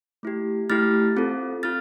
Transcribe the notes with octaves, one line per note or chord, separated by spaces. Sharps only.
A3 E4 G4
A3 E4 G4 F6 A6
C4 F4 A4
F4 A4 F6 A6